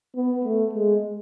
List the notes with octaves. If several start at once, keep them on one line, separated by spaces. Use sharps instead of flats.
B3
A3
G#3